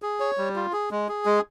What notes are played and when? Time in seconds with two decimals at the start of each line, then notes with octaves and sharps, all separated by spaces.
0.02 G#4
0.20 C#5
0.38 G3
0.56 F4
0.73 G#4
0.91 G#3
1.09 G#4
1.26 G#3